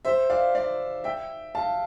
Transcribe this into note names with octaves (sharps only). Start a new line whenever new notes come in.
C5 E5
D5 F5
D5 F5
E5 G5
F5 A5